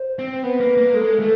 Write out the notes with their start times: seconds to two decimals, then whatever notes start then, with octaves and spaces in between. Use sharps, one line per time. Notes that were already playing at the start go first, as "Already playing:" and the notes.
Already playing: C5
0.19 C4
0.43 B3 B4
0.60 A#3
0.77 A#3
0.94 G#3 A4
1.20 A3